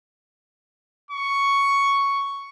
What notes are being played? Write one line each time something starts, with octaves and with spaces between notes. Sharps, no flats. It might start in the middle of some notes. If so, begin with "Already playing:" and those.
C#6